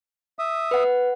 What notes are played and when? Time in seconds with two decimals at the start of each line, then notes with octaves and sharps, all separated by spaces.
0.39 E5 D#6
0.71 B4 F#5